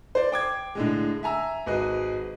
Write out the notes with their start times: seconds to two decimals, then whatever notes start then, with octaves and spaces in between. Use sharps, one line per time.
0.15 C5 D5
0.32 G5 D6 G#6
0.75 A2 D3 G#3
1.23 E5 G#5 A#5 E6
1.66 G#1 F#4 G#4 B4 D#5